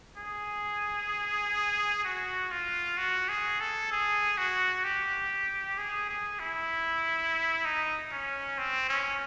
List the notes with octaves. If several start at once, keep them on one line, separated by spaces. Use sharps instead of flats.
G#4
F#4
F4
F#4
G#4
A4
G#4
F#4
G4
G#4
G#4
E4
D#4
C#4
C4
C#4